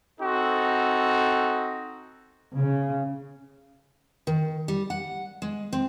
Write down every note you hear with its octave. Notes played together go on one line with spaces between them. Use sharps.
C4 D#4 F#4 A4
C#3
D#3
G3
F#5
G#3
C4